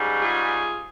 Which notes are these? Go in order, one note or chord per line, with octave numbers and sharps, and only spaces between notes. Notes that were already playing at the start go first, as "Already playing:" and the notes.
Already playing: G#2 G3 C#4
F4 G#4